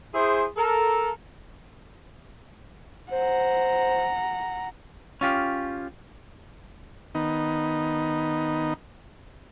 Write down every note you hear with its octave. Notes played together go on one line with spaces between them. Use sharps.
E4 G#4 C5
A4 A#4
C5 F#5 A#5
C#4 F4 G4
D#3 B3 D#4